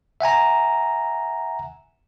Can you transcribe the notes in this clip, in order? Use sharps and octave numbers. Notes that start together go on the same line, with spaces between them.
E5 F#5 G#5 A#5